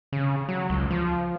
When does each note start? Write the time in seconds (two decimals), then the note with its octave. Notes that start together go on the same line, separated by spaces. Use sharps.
0.12 C#3
0.49 F#3
0.70 C#2
0.90 F3